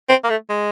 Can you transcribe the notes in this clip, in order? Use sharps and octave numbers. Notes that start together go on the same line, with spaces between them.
C4
A#3
A3
G#3